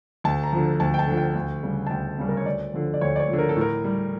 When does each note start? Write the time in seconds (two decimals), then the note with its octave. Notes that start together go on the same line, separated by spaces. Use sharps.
0.24 D2 A5
0.43 A#5
0.53 D3 F3
0.80 D2 A5
0.94 G5
0.99 A5
1.07 D3 F3
1.17 G5
1.35 D2
1.63 C#3 G3
1.87 A5
1.90 D2 G5
2.19 C#3 G3
2.28 A#4
2.37 C#5
2.46 D2 D5
2.74 D3 F3
2.94 D5
3.01 D2 C#5
3.16 D5
3.20 C#5
3.29 D3 F3
3.38 A#4
3.49 A4
3.56 A2 A#4
3.84 G3